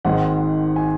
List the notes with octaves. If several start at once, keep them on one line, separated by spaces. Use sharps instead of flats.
G#1 G#2 D#3 G#3 F#5
G#5